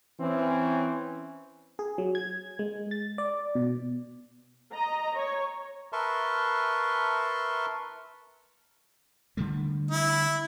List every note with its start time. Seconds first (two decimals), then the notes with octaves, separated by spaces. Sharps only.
0.19 E3 C4 C#4
1.79 G#4
1.98 F#3
2.15 G#6
2.59 G#3
2.91 A6
3.18 D5
3.55 B2
4.73 D#5 A#5
5.16 C#5
5.93 A#4 B4 E5 A5 C6 C#6
9.37 D3 G3 A3
9.91 E4